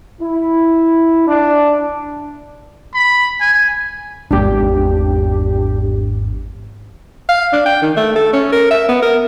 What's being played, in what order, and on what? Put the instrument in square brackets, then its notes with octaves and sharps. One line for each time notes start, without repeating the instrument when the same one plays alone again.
[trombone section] E4
D4
[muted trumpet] B5
G#5
[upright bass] G#1 E2 [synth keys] D4 G4
[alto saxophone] F5
D4
G5
D#3
A3
A4
C#4
A#4
E5
B3
A#4